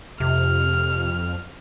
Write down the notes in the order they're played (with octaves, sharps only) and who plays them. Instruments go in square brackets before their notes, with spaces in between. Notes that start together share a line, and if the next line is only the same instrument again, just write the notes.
[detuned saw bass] F2 [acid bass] C3 [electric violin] F6